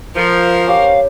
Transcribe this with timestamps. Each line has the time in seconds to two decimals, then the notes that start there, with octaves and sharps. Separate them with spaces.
0.16 F3 A#4 C5
0.67 C#4 G4 F5